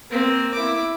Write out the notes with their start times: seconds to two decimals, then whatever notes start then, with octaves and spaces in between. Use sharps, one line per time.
0.11 A#3 C4
0.54 E4 D6